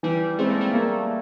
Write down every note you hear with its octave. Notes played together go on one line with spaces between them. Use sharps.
E3 G3
G#3 A3 C4
A#3
A3
A#3